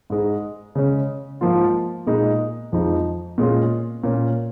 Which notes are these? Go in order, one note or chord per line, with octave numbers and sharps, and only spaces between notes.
G#2 G#3 D#4
C#3 G#3 C#4
G#2 F3 A#3 F4
A#2 G#3 D#4
F2 F3 G#3 D#4
A#2 G#3 C#4 F4
A#2 A#3 C#4